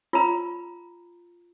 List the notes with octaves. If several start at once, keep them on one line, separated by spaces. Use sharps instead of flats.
F4 A#5